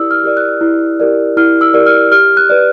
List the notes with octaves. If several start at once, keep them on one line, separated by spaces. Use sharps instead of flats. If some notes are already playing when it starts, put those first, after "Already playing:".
Already playing: E4 G4 A#4 D5 D#6 E6
F6
G4 A#4 D5
F#6
E4
G4 A#4 D5
E4 F6
E6
G4 A#4 D5
F6
G4 F6
F#6
B4 D5